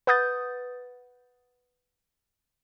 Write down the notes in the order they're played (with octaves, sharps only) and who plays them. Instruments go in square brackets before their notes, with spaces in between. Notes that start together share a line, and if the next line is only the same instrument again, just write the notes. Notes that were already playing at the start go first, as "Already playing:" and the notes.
[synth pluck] B4 F#5 D#6 G6 A6